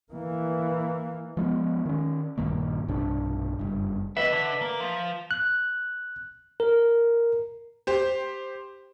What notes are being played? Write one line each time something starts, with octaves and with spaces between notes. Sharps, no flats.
E3 A#3
F3 G#3 A#3 B3
D#3 C#4
A#1 G2 D#3 A#3
B1 G2 C3 D4
F#1 G2
B3 B4 D#5 E5
D3
A#3
F3
F#6
A#4
G4 C5